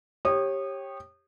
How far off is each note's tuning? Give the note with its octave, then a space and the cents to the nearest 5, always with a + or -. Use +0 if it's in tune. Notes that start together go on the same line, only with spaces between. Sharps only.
G4 +0 C#5 -25 D#6 -25